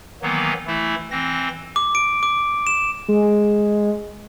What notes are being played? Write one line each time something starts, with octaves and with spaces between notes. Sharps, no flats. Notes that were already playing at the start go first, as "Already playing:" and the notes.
D#3 E3 F#3 A#3 B3
E3 A3 E4
E3 C4 A#6
D6
D7
D6
E7
G#3